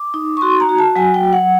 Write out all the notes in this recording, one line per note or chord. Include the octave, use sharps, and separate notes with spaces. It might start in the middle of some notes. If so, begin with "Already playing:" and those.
Already playing: D6
D#4
C#6
F#4 C6
A#5
F#4
A5
F#3 G#5
G5
F#3
F#5